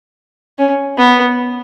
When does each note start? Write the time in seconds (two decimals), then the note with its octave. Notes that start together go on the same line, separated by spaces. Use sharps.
0.58 C#4
0.98 B3